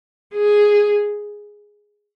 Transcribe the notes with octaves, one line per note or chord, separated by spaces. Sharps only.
G#4